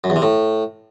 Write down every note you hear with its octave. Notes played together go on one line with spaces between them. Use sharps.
F#2
E2
C3
A2